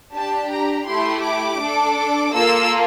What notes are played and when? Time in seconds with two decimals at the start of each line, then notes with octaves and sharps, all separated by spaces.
0.14 D4 G4 A5
0.51 A#5
0.87 A3 E4 G4 C6
1.23 D6
1.60 D4 A4
2.33 A#3 F4 A4 E6